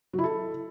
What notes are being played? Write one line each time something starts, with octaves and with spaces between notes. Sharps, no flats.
F#3
E4
A4